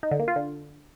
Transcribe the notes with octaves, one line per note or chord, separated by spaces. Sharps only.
D#4
D3
A#3
F4
D3